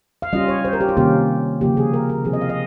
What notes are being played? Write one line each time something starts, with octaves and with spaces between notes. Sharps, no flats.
F5
G3 C#4 F4 D#5
C#5
C5
A#4
G4
F4
C3 D#3 G3 A#3 C#4 G4
C#3 F3 A#3 G4
G#4
A#4
A#4
C3 F3 C4 F4 G#4
D#5
F5
D#5